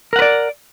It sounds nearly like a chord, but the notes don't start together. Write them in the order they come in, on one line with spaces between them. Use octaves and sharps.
A#4 F#5 B4 D5